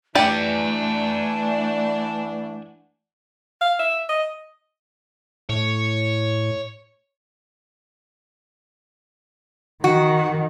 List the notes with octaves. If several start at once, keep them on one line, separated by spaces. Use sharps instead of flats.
E3 A3 D4 G4 D5 F#5 G#5
F5
E5
D#5
A2 C#5
D#3 F#4